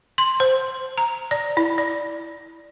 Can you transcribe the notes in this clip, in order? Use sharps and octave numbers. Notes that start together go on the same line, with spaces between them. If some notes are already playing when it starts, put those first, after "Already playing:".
C6
C5
A#5
D5
E4
D5